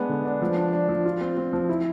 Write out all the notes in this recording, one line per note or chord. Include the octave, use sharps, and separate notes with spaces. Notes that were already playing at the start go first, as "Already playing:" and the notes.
Already playing: G#3 B3 D4
D3
D4
F3
D4
D4
F3
F4
C4
C4
F3
E4